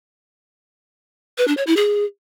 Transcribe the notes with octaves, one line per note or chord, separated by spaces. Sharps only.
B4
D4
C#5
E4
G#4